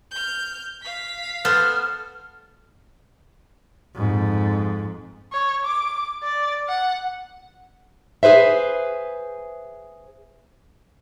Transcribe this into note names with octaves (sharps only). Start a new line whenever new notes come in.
F6 G6
F5 B6
B3 A4 C5 F6
F2 G#2
C#5
D6
D5
F#5
G#4 B4 C5 E5